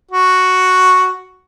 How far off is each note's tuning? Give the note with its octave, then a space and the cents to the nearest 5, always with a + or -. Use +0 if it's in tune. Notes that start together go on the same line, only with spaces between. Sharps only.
F#4 +0